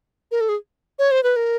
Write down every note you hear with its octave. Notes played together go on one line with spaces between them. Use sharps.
A#4
A4
G#4
C#5
C5
B4
A#4